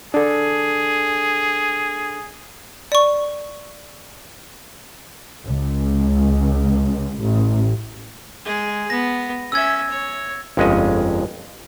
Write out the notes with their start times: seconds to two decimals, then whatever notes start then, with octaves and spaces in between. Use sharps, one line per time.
0.14 D4 G#4 A4
2.92 D5 C#6
5.44 C#2
7.20 A1
8.46 G#3 G#4
8.90 B3 A#6
9.52 C#4 E5 E6 G#6
9.90 C#5
10.57 G1 F2 G#3 C#4 D#5